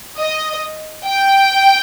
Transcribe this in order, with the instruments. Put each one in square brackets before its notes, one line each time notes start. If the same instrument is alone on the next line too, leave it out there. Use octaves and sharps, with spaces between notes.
[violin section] D#5
G5